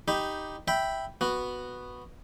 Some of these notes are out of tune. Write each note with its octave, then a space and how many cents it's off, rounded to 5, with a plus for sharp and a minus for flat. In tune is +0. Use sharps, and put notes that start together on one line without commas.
D#4 +0 G4 +0 B5 +0
E5 +0 G5 +0 B5 +0
B3 +0 F#4 +0